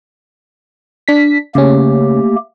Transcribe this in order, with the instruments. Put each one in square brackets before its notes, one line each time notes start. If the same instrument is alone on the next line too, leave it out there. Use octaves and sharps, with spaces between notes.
[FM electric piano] D4 B6
[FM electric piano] C#3 C#4 [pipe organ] A3 A#3 G4